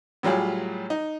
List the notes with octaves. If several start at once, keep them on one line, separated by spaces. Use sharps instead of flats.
A2 F#3 G3 F4 G#4
D#4